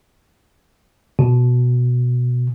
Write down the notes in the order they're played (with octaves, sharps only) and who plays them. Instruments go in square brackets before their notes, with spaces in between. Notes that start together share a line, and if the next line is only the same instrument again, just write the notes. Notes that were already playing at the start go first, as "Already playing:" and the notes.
[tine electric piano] B2